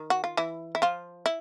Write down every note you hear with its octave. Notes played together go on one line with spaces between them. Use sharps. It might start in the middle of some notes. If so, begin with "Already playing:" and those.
Already playing: D#3
F#4
F4
E3 E4
E4
F3 F4
E4